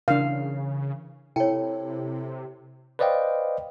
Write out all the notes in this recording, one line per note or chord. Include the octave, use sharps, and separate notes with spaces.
C#3 E3 D4 A#4 F5
C3 E4 A4 C#5 G5
B4 C5 D5 D#5 F5 G5